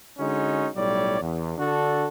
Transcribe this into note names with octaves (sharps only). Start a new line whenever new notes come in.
D3 G#3 C#4 D#4 F#4
B1 A2 G3 C#5 D5
E2
D3 D4 F#4 A4